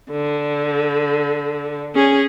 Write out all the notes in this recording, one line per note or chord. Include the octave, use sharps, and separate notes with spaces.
D3
C#4 G#4